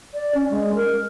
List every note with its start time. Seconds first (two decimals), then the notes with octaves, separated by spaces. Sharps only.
0.14 D5
0.35 C#4
0.51 G#3
0.75 A#4